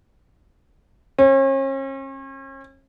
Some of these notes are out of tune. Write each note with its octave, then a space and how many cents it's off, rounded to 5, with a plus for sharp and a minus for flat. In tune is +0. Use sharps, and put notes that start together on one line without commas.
C#4 -40